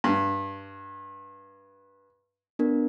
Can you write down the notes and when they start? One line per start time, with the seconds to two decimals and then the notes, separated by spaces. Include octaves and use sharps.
0.04 G2
2.59 B3 D4 A#4